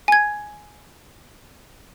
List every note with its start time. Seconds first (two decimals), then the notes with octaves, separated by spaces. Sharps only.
0.08 G#5 G#6